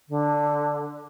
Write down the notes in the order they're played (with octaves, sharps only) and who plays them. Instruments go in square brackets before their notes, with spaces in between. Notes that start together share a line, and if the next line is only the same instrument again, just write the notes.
[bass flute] D3